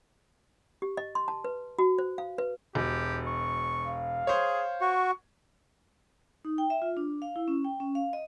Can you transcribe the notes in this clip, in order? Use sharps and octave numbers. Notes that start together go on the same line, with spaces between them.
G4
D#5
C6
A5
B4
F#4
C5
F5
B4
E1 G4
C#6
F5
G#4 C5 C#5
F#4 C#6
D#4
G5
E5
F4
D4
F5
E4
C#4
G5
C#4
F5
D#5